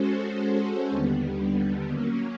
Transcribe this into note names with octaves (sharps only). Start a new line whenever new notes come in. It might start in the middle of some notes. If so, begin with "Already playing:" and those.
Already playing: G#3 C#4 F#4 A4 C5
D#2 D3 G3 B3
F#3 A#3 C#4